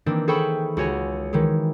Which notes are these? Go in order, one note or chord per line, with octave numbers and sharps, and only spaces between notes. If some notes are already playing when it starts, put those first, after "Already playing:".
D#3 E3 A#3 C4 D4
G#4 A4 C5 G5 B5 C#6
C#2 F#4 C#5 G#5
D#3 E3 G#3